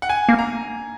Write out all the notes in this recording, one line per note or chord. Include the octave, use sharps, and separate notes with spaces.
F#5
G#5
A#3
A#5